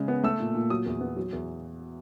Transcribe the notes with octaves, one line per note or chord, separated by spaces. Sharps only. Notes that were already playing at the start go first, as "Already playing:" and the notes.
Already playing: C#3 G#3
B3
A3 E6
A#2
A#2
F#3 D#6
E2
B3
F#3
E2